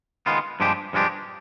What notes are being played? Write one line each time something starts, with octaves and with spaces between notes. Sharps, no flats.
D#3 G#3 B3 F4
G2 F3 G#3 D4 G4
G2 F3 G#3 D4 G4